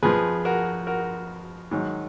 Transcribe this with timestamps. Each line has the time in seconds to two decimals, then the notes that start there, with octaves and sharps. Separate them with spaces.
0.03 F2 F3 G#4 B4
0.45 F#4 A#4
0.87 F#4 A#4
1.71 G#2 D#3 F#3